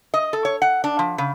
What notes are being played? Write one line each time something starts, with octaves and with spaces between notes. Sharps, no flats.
D#5
A4
C#5
F#5
D4
F3
C#3